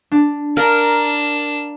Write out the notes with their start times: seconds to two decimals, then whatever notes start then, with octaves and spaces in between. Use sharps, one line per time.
0.12 D4
0.57 D4 A#4 F5